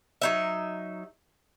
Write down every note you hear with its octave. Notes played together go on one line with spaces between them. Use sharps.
F#3 D#4 E5